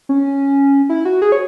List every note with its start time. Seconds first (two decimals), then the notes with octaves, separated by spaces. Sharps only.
0.09 C#4
0.89 E4
1.05 F#4
1.22 G#4
1.32 C#5